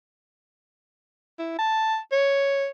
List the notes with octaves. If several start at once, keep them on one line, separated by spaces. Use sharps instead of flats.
E4
A5
C#5